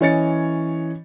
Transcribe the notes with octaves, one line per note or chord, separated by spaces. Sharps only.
E3 C#4 C#5 D#5 A6 C#7